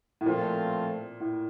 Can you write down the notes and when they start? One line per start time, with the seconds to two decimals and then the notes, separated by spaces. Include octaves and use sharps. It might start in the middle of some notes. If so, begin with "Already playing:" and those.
0.21 A2
0.26 A#2 F3 A3 C4 F4
1.20 A2